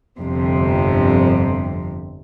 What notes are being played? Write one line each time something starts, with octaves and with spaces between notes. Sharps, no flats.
G1 F2 C3